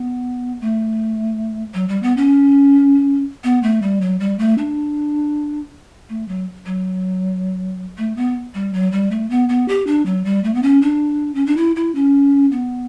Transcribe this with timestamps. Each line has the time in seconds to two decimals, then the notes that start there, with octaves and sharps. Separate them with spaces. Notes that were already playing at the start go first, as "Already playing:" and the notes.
Already playing: B3
0.61 A3
1.74 F#3
1.89 G3
2.03 B3
2.17 C#4
3.44 B3
3.63 A3
3.82 G3
4.01 F#3
4.20 G3
4.39 A3
4.58 D4
6.09 A3
6.28 F#3
6.66 F#3
7.98 A3
8.17 B3
8.54 G3
8.74 F#3
8.92 G3
9.11 A3
9.30 B3
9.49 B3
9.68 G4
9.87 D4
10.06 F#3
10.25 G3
10.44 A3
10.55 B3
10.63 C#4
10.82 D4
11.35 C#4
11.46 D4
11.57 E4
11.76 E4
11.95 C#4
12.52 B3